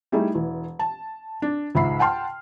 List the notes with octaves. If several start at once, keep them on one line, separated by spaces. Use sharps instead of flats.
G3 A3 D#4 E4 G#4
E1 E3
A5
D4
C#2 G#2 E5 B5 C7
F#5 G5 A5 C6 F6